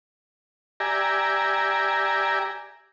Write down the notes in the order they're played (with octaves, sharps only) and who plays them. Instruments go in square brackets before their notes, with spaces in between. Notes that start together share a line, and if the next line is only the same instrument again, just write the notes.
[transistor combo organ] G4 D5 E5 G#5 A#5